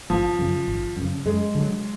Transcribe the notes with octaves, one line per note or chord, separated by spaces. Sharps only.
G#1 F3
F#2 C#3
G#1
F#2
C#3
F#2 G#3
D3 F#3